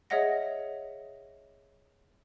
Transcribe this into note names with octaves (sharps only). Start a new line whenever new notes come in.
G#4 C#5 D#5 E5 F#5 A#6